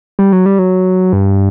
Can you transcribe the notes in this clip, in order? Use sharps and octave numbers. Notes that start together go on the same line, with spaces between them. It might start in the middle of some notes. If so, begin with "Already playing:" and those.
G3
F#3
G3
F#3
G2